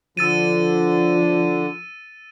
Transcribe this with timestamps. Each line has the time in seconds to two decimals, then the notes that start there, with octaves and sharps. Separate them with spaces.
0.17 D3 F3 E6 A6 D#7